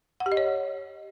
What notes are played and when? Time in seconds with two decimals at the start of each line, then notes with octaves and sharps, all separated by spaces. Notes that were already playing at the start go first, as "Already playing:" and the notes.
0.20 F#5
0.26 G4
0.32 D#5
0.37 C#5